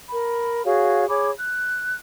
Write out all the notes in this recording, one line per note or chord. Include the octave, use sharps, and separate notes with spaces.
A#4 B5
F#4 G#4 C#5 F5
G#4 C#5 B5 D6
F#6